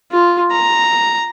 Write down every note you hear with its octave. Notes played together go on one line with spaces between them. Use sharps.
F4
A#5